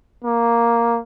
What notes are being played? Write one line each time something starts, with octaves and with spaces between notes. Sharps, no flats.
A#3